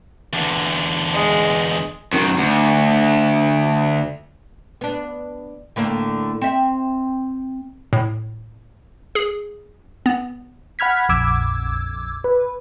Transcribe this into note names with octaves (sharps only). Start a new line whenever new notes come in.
E2 D3
G#3
F#2 D#3
D2
B3 D4
A2 D3 A#3
C4 E5
A2
G#4
B3
F#5 B5 F6 G#6 B6
A#1 F2 D6 E6 G#6
B4